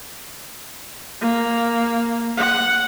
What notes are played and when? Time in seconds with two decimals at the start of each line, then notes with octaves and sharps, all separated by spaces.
1.22 A#3
2.38 F#5